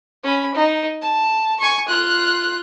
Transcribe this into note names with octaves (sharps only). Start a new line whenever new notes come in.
C#4 B5
D#4
A5
G#5 C#6
F4 F#6